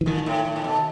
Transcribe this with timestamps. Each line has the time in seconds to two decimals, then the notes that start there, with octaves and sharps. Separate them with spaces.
0.01 E3
0.06 A#2 D#3
0.26 A2
0.45 A2
0.56 A#2
0.64 B2